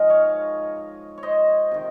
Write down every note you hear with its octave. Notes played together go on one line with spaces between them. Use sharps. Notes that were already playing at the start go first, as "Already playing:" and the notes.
Already playing: G#2 F3 G#3 A#4 D#5
C#5 F5
C#5
C5 D#5
C3 D#3